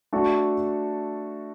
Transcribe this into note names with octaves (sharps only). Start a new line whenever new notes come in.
A3 D4 F#4 A4